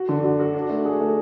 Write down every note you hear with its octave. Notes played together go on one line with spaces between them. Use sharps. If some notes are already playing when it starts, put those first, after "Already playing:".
Already playing: F#4
D3
F#4
F#4
D4
A3
G#4
A3